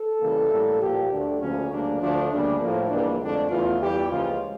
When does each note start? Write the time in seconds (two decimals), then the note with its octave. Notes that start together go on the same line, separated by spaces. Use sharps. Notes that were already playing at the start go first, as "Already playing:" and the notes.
Already playing: A4
0.21 C#2 C#3 E3 G3 A#3
0.51 A2 G3 A#3
0.81 A#2 F3 A#3 G4
1.10 D2 D3 A3 D4
1.40 D2 C#3 F3 A#3 C#4
1.70 D2 C#3 G3 A#3 D4
2.00 D2 D3 F3 A3 D4
2.30 D2 C#3 G3 A#3 D4
2.60 A2 F3 A#3
2.90 C#2 C#3 E3 G3 A#3 D4
3.21 F2 D3 A3 D4
3.50 E2 C#3 E3 A3 F4
3.80 E2 E3 G3 G4
4.10 C#2 C#3 F3 A#3 F4